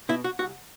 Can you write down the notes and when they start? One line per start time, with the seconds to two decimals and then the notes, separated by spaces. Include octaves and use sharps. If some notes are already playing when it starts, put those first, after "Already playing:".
0.09 B2 E4
0.24 F#4
0.39 C2 F#4